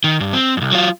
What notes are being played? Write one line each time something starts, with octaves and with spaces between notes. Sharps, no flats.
D#3
G2
C4
C2 F#2
F#3 F4